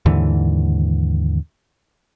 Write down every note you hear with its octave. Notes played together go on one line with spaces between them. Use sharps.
D#2 G#2 D3 E3